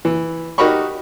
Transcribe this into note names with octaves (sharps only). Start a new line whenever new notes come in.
E3
D#4 F#4 G4 A#4 B5 C#6